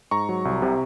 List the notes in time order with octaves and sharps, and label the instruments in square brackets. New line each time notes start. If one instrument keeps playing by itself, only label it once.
[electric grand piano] G#2 A#5 C#6
F#3
C2
C3